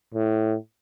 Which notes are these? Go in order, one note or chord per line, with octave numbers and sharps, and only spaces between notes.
A2